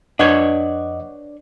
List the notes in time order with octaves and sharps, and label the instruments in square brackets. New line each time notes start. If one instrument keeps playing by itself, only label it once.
[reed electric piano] F2 D#5 F#5 [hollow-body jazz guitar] D4 B4 C#5